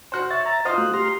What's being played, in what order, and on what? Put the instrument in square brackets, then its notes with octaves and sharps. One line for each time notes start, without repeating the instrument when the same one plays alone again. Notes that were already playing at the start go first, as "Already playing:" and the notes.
[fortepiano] F#4 C5
[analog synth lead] C#5 [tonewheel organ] E5 A6
[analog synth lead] A#5
[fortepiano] F4 D#5 F5 [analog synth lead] C5
[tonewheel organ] A3 F#4 F#6
[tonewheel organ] G4 A#5 F6 [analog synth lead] C6